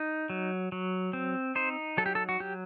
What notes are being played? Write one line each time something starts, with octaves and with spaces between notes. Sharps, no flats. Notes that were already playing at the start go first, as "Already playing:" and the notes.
Already playing: D#4
F#3
F#3
C4
D#4 C5
F#3 A4
G4
A4
F#4
F#3 G4